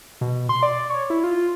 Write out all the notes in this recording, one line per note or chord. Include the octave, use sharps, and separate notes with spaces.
B2
C6
D5
C#5
E4
F4